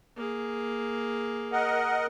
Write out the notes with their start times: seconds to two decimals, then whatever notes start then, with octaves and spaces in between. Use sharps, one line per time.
0.16 A#3 G#4
1.52 A#4 D#5 F#5